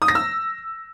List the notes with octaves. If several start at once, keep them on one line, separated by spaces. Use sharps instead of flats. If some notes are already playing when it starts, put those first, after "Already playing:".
D#6
A#6
E6